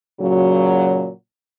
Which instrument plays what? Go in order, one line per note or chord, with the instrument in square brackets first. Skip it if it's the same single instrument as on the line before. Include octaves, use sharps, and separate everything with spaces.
[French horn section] A#2 C#3 F#3